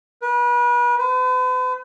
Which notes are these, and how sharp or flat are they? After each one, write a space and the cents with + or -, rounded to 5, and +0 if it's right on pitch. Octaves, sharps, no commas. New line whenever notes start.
B4 -35
B4 +45